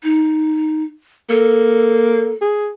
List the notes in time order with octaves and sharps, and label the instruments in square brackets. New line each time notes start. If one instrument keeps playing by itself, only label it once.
[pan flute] D#4
[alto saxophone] A#3 [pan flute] A4
[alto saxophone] G#4